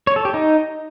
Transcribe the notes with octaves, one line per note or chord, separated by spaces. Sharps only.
C#5
A4
G4
D#4